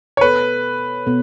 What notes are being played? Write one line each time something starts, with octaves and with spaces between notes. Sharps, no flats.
C#5
B2 B3 A4 B4
B2 B3 A4